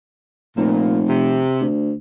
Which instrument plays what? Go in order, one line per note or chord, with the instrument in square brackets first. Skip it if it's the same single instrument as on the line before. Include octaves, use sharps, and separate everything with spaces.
[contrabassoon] F1 [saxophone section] A#2
[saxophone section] C3
[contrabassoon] D2